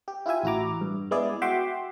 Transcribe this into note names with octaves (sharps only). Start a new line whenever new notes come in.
G4
E4 F4 G4 E5 G#5
A1 E4 F#4 A#5 D6
G2
G#3 B3 E4 G#4 D5
F#4 E5 F#5 G5 C6 D6